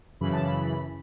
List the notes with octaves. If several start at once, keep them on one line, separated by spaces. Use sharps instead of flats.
F#2 C#3 E3 B5
A5
B5